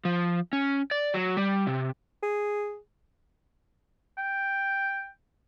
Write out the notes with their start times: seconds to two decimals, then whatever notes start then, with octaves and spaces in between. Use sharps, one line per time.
0.05 F3
0.53 C#4
0.91 D5
1.14 F#3
1.37 G3
1.67 C3
2.22 G#4
4.18 G5